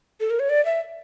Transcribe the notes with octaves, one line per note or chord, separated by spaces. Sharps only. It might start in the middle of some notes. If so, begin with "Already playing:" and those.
A4
A#4
C#5
D5
E5